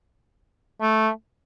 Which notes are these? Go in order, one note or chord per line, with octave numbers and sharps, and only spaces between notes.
A3